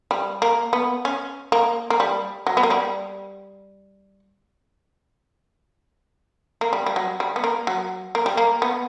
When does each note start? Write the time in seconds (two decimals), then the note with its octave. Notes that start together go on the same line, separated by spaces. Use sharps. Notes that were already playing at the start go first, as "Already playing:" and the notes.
0.11 G3
0.42 A#3
0.73 B3
1.05 C#4
1.52 A#3
1.90 A#3
2.00 G3
2.47 F#3
2.57 B3
2.63 A#3
2.70 G3
6.61 A#3
6.73 G3
6.86 G3
6.96 F#3
7.20 G3
7.36 B3
7.44 A#3
7.67 F#3
8.15 A#3
8.26 G3
8.37 A#3
8.62 B3